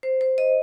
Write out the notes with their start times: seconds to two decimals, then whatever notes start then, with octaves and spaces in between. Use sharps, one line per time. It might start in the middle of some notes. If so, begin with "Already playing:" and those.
0.03 C5
0.21 C5
0.38 D#5